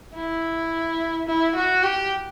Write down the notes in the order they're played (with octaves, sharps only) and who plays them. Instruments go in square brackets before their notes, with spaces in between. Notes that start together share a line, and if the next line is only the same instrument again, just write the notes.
[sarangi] E4
E4
F#4
G4